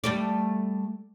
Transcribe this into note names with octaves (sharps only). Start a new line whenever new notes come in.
G3 A3 D5